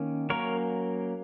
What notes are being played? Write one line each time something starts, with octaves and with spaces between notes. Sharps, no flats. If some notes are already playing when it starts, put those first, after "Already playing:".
Already playing: D#3 A#3 C#4
F#3 A#3 C#4 A#4 C#5